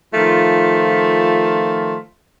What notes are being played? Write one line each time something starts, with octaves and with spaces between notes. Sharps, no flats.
D#3 F3 A3 F4